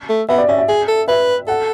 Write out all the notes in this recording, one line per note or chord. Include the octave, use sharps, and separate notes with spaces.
A3
B3 E5
D5
C#4 E5
E5
G#4
A4
B4 E5
A4 F#5